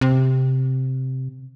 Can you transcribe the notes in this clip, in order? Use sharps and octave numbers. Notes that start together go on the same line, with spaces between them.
C3